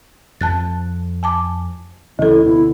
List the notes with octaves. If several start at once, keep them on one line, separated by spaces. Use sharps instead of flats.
F2 F3 A5 F#6 A6
G#5 A5 D6
D2 C#3 E3 F#3 E4 A4
B2 D3 B3 E4